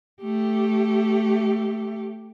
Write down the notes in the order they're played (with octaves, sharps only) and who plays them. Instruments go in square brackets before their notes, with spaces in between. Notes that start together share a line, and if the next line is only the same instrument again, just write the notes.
[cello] A3 G4